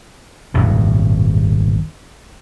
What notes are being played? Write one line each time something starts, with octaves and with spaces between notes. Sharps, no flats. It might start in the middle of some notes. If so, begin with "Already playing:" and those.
D#1 G#1 F#2 B2